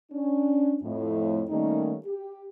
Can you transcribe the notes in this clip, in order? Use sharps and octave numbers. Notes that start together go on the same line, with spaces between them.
C#4 D4
F2 A2
D#3 G3 A3 A#3 C#4 D#4
G4